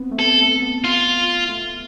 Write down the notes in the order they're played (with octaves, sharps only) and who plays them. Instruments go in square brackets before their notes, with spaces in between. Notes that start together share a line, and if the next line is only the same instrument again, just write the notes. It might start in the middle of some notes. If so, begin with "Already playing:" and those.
Already playing: [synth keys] B3 C4
A3
[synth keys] B3 [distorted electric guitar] A4
[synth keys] A3
B3
[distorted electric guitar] F4
[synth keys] A3